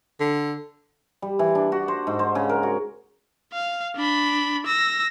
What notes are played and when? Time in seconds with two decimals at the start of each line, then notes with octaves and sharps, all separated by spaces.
0.20 D3
1.22 G3
1.39 E3
1.55 D4
1.72 F#4
1.88 C5
2.07 G#2
2.19 C5
2.35 C#3
2.49 A#4
2.63 F#4
3.53 F5
3.96 D4 B5
4.66 E6 A#6